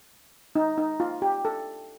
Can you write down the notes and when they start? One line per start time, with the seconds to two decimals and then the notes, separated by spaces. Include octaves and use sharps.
0.55 D#4
0.78 D#4
1.00 F4
1.22 G4
1.45 A4